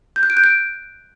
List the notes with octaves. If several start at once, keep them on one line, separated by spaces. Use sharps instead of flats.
G6
F#6
D7
G6
D7